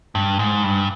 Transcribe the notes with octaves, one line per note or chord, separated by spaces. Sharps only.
G2
G#2
G2